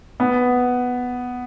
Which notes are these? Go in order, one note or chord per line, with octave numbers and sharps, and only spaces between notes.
B3